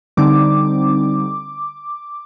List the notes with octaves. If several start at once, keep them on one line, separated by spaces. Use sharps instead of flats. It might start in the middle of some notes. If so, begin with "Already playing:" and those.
D3 G3 C4 D#4 D6